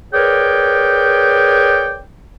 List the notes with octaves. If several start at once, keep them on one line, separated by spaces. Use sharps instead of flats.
G#4 A#4 B4 C#5 D5 G5